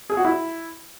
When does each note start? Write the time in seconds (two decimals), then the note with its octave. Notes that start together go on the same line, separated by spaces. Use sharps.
0.10 G#4
0.17 F#4
0.25 E4